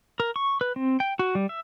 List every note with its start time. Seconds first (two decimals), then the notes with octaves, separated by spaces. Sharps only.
0.20 A#4
0.36 C#6
0.61 B4
0.76 C4
1.00 G5
1.19 F#4
1.35 G3
1.49 E5